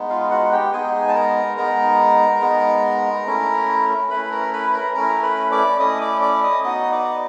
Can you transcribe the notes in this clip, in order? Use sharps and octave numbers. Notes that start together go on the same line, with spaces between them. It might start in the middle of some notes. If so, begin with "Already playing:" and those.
Already playing: G#3 B3 D#4
F4 F5
F#4 F#5
G4 G5
G#3 B3 D#4 G#4 G#5
A5
A#4 A#5
G#3 B3 D#4 A#4 A#5
G#3 B3 D#4
A3 C#4 E4
A3 C#4 E4 B4 B5
A#4 A#5
B4 B5
B5
A#4 A#5
A3 C#4 E4 A#4 A#5
B4 B5
D5 D6
A3 C#4 E4 D#5 D#6
D5 D6
D5 D6
D#5 D#6
B3 D#4 F#4 D#5 D#6
D5 D6